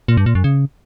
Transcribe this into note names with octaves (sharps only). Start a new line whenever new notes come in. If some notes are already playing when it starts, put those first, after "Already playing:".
A#2
G2
A#2
F#2
C#3